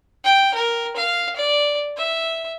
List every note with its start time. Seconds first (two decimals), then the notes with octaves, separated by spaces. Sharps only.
0.24 G5
0.54 A#4
0.96 F5
1.36 D5
1.97 E5